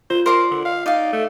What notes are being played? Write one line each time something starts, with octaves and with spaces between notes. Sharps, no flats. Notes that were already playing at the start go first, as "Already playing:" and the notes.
F4 C5
A#4 C5 D5 C6
D3
F5
D#4 D5 F5
A3